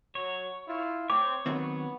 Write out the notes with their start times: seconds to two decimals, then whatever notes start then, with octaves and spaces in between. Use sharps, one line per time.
0.15 F#3 C#5
0.65 E4 F4
1.10 C4 C#5 D6
1.46 D#3 F#3 B3 C4